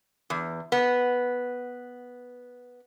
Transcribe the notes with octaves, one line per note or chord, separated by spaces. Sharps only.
E2
B3